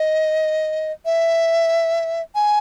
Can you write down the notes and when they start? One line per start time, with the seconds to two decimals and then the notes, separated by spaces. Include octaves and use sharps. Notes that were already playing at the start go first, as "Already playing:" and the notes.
Already playing: D#5
1.05 E5
2.35 G#5